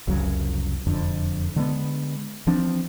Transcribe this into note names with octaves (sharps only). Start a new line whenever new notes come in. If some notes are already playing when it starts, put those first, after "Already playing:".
F1 C2 C#3 F#3
E1 F2 D3
D3 G#3 B3
E3 F3 C4 D4